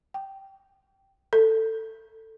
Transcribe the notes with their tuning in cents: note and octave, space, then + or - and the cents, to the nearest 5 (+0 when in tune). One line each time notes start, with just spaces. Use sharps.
G5 -10
A4 +15